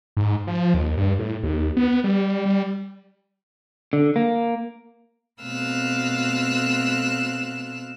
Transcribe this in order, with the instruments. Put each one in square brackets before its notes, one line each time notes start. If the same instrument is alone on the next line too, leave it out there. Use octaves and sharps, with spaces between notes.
[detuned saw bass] G#2
F3
D#2
G2
A2
D#2
B3
G3
G3
[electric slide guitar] D3
A#3
[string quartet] B2 A3 C4 F5 E6 F#6